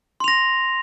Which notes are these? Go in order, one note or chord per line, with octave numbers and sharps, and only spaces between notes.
C6 A#6 F7